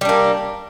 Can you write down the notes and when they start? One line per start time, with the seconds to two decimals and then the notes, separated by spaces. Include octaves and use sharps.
0.01 G3
0.05 D4
0.09 A#3